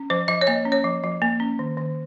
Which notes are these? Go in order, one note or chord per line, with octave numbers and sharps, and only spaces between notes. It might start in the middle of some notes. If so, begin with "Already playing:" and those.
Already playing: C#4
F3 C5
F3 D#5
C#5
A#3 D#5
C#4
C#5
F3
F3
A#3
C#4
D#3
D#3